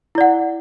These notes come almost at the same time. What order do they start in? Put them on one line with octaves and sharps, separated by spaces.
E4 D5 F#5